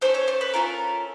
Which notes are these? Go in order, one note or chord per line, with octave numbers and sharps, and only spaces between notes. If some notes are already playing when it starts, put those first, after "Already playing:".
C#4 F4 A4 C5
C#5
C5
B4
C#4 F4 A4 A#4